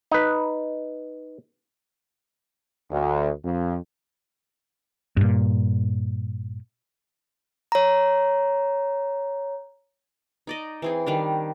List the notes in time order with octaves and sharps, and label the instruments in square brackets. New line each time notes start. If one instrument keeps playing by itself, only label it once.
[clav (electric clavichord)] D#4 B4
[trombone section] D2
F2
[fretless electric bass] G2 A#2
[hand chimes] C#5 A#5
[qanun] D#4 D5 D#5
E3 C4 G#4
D#3 G3 D4